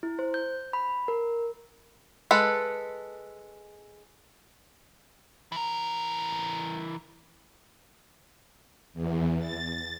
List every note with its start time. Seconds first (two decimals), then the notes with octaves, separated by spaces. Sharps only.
0.03 E4
0.19 C5
0.34 G6
0.73 B5
1.08 A#4
2.31 G#3 A4 B4
5.52 E3 A#4
8.94 E2
9.39 A6